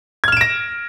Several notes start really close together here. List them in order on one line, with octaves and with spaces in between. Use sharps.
G#6 F6 E7 D7 A#6